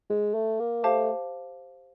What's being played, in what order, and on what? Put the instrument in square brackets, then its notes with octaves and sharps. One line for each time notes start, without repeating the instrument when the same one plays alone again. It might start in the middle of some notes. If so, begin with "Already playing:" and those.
[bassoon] G#3
A3
A#3
[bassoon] A3 [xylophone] G4 C5 F5 A5 D6